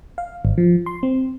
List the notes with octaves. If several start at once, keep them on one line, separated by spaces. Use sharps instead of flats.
F5
G#1
F3
C6
C4